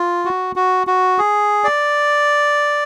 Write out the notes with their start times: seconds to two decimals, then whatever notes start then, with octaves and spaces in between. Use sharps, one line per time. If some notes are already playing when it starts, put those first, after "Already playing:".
Already playing: F4
0.25 F#4
0.56 F#4
0.87 F#4
1.18 G#4
1.64 D5